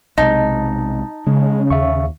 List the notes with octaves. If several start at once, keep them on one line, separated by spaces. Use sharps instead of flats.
B1 C3 G#3 D#4 D#5 A5
C#3 G#3
D#2 E5 F5 C#6